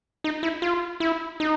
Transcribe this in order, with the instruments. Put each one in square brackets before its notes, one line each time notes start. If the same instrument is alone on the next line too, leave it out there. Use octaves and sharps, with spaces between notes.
[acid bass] D#4
E4
F4
E4
D#4